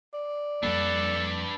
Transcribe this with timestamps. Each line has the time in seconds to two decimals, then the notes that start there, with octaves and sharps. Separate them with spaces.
0.14 D5
0.63 F2 G3 A#3 D4 A4 B4